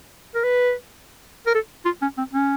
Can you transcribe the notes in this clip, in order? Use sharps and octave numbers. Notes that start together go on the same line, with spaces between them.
A#4
B4
A#4
A4
F4
C#4
C4
C#4